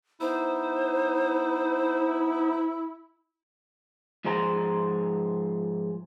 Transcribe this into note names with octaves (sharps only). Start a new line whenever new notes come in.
B3 D#4 E4 C5
G#2 F3 G#4 C5 A#5